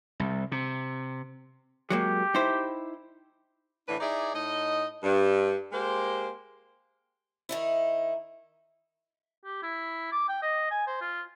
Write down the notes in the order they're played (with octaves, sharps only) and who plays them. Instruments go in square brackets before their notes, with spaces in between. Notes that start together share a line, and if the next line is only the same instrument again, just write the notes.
[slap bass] C2
C3
[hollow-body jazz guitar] F#3 G#3 A#3 [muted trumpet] G4
[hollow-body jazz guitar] D#4 E4 C5
[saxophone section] A2 D3 E3 D4 B4
D#4 E4 G#4 D5
A2 D#4 D#5
G2
G#3 A#3 G4 C5
[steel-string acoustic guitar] D#3 D#4 E4
[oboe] G4
E4
D6
G5
D#5
G#5
C5
F4